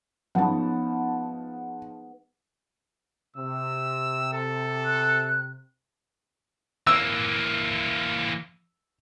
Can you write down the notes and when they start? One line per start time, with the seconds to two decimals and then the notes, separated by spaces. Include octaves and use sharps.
0.35 G#2 F3 B3 C#4 D#4 F#5 A5
3.37 C3 E6
4.33 A4
4.85 F#6
6.87 E3 A#3 E6